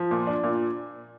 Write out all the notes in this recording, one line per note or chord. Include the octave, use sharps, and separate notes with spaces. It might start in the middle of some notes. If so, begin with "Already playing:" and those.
Already playing: F3
A#2
D4
A#2